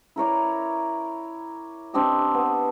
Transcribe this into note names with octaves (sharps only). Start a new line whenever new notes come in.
E4 A#4 C#5 D5
C4 D4 G4 D#5
B3